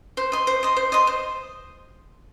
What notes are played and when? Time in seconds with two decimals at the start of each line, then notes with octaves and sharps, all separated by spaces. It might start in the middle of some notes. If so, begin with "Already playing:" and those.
0.17 C5
0.32 D#5 C6
0.47 C5
0.63 D#5 C6
0.77 C5
0.92 D#5 C6
1.07 C5